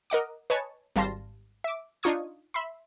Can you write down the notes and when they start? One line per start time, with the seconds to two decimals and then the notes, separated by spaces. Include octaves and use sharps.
0.10 A#4 D#5 F#5 D6
0.50 B4 C#5 D#5 G#5 A5 C#6
0.96 G#1 G3 F5 A5 C6 A#6
1.64 E5 D6
2.03 D4 D#4 F4 C#6 D#6 G#6
2.54 E5 B5 C6